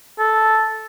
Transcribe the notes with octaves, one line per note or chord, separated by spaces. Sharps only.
A4